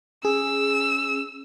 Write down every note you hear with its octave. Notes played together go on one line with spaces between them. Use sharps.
C#4 G#4 E6